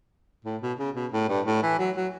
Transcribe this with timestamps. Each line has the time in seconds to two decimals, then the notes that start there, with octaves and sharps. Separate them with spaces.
0.45 A2
0.61 B2
0.78 C#3
0.95 B2
1.12 A2
1.29 G2
1.46 A2
1.63 E3
1.79 F#3
1.96 F#3